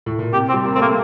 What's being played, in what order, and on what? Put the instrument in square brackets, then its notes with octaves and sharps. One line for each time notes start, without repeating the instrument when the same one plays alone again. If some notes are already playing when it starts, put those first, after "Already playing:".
[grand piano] A2
A#2
[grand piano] C3 [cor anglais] G4
[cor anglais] C4
[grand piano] G3
A#3
[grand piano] A3 [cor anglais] C4
[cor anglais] A#3